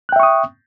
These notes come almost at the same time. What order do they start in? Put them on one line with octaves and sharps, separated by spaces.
F#6 G5 E5 C#6 D#6